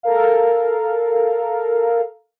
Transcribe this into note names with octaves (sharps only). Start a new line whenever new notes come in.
A4 A#4 F5